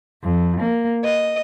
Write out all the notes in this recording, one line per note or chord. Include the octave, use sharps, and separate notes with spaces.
F2
A#3
D#5